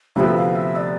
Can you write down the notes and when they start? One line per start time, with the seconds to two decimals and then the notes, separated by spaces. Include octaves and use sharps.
0.16 D2 C3 F3 B3 E5 F5
0.36 F5
0.55 E5
0.76 D5